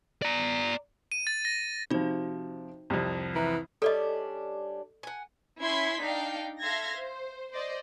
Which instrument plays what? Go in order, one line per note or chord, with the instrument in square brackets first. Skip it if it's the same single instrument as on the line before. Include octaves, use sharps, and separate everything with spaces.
[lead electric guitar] D5 A#5
[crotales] D#7
A6
A#6
[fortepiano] C3 F3 [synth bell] D#4 F#4 C5
[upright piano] C2 F2 [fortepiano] C3 G3
[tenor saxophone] E3 [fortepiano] E4 A#5
[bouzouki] G3 C#4 D4 [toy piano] A4 D5 D#5
[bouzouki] F#5 G#5
[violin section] C#4 E4 C6 G#6 B6
D4 D#4 F5 G5
A4 E5 F5 C6 G#6 A#6
C5
C5 D5 D#5